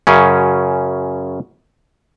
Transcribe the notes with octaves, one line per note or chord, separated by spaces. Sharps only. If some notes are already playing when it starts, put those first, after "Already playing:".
F#2 C#3 C#4